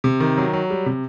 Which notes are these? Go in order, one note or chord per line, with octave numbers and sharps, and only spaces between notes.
C3
D#3
F#3
F#3
G3
C3